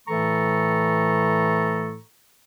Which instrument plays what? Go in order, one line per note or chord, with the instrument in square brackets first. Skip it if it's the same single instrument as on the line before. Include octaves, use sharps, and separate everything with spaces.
[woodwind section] A2 E3 A3 A4 A#5 C#6